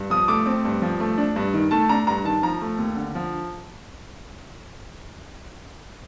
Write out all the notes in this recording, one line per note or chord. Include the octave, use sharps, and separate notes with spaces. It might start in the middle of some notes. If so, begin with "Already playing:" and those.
Already playing: G2
F3 D#6
A3 D6
C4
G2
F3
A3
D4
G2
D#3
A3 A5
D4 A#5
G2 A#5
D#3 A5
F3 A#5
A3
D#2
D3
F3